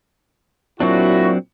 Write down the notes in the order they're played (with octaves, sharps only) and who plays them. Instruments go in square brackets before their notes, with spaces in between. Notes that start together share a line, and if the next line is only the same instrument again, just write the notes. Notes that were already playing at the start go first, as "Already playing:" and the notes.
[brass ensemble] A#2 E4 F#4 [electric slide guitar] F#3 C4 D4